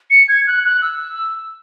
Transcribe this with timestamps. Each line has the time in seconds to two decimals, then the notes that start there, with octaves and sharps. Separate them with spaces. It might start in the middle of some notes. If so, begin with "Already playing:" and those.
0.10 C#7
0.28 G#6
0.47 F#6
0.64 F#6
0.82 E6